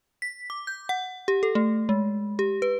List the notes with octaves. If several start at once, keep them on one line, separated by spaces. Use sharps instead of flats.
B6
D6
G6
F#5
G4
A4
A3
G#3
G4
B4